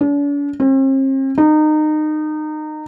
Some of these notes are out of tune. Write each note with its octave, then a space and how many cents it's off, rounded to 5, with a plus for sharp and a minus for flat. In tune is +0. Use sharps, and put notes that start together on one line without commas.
D4 -45
C4 +45
D#4 -25